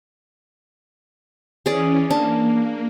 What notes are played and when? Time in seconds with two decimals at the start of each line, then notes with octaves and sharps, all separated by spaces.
1.66 E3 C#4 G#4 D5
2.10 A#3 D4